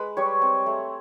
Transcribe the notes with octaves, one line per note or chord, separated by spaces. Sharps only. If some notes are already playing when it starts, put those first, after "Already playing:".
Already playing: G#3 B4 B5
G3 C#5 C#6
C4
A3